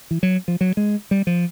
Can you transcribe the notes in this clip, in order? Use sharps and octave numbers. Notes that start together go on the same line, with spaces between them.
E3
F#3
F3
F#3
G#3
G3
F3